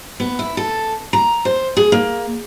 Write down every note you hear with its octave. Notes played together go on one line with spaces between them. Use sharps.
B3
E4
A4
A#5
C5
G#4
A#3